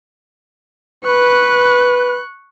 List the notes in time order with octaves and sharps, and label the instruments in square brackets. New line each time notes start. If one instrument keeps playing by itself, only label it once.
[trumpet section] B4 [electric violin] C#6 F#6